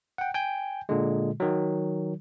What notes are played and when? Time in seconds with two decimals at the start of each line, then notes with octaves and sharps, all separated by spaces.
0.18 F#5 G5
0.34 G5 G#5 G6
0.89 A#2 D3 G#3
1.40 D#3 F#3